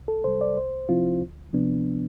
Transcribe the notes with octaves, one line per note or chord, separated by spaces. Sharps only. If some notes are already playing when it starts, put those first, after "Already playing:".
Already playing: C2
A4
C3 G3 C5
D5
C2 C5
C3 F3 C4 E4 F4
D2
C3 F3 B3 D4